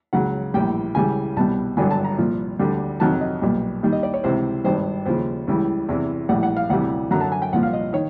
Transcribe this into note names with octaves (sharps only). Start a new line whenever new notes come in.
C#2 C#3 F#3 F#5
A#1 A2 E3 G3 G5
C#2 C#3 E3 G3 G#5
C2 B2 G3 A5
G#1 G2 D3 F#3 G#5
A5
A#5
C2 A#2 F3
D2 D3 G3
F2 C3 D#3 F#3 A5
D#5
B1 A#2 G3
D#2 D#3 G3
D#5
D5
C#5
C#2 C3 E3 C5
G#1 G2 D#3 G3 C5
D#2 C#3 F3 C5
C#2 C#3 E3 G3
E2 C3 E3
A#1 A2 E3 G3 F#5
F#5
F5
D2 C3 E3 G3 F#5
F#2 D3 F#3 A#5
A5
G#5
G5
C2 A#2 F3 F#5
F5
D#5
D#3 C#5